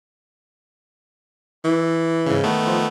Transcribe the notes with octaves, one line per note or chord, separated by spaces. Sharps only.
E3
G#2 C#3
D#3 A3 B3
F3